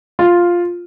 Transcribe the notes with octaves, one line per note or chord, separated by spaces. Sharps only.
F4